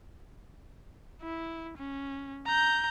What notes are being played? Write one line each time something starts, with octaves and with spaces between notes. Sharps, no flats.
E4
C#4
A#5 G6